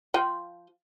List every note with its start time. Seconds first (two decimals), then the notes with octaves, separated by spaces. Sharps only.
0.14 F3 F4 G5